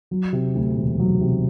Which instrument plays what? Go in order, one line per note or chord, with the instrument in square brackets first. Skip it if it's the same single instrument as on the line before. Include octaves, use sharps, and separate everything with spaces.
[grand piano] F#3
C3
D2
E1
F#3
C3